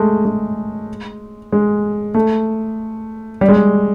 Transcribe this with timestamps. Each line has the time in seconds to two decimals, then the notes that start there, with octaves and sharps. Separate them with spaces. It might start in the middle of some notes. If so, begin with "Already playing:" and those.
Already playing: G#3 A3
0.25 G#3
1.52 G#3
2.15 A3
3.41 G3
3.49 G#3
3.56 G3